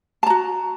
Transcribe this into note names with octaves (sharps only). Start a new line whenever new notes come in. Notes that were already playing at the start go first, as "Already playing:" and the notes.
F#4 A5 A#5